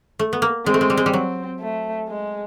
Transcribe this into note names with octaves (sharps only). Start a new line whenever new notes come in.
A3
B3
A#3
G#3 C4
A3
G#3
G3
G#3
G3
F#3 C4
A3
G#3